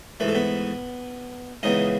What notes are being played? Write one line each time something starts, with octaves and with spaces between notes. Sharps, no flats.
G#2 E3 A3 B4
A4
B3 B4
C#2 C#3 E3 B3 D#4 D#5